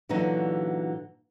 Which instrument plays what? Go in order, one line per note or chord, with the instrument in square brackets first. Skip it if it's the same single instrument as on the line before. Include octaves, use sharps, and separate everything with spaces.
[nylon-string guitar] A#2 D3 E3 F#3 D#4 F#4